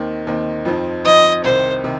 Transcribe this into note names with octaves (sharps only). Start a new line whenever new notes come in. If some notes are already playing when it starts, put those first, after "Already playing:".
Already playing: D#2 D#3 C4 D#4
D#2 D#3 C4 D#4
F2 F3 C4 D#4
F2 F3 C4 D#4 D#5
C2 C3 D#3 C5
C3 D#3